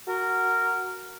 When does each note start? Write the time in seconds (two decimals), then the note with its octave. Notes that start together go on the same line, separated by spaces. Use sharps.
0.07 F#4 A#4